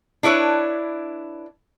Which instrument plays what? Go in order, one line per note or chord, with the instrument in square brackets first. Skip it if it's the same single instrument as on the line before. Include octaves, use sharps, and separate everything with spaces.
[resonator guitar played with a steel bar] D4 E4 B4 C#5